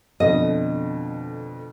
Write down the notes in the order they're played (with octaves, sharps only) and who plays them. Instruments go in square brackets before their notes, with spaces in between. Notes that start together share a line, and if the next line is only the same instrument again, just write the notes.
[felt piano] F2 B2 D3 [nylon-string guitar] D#5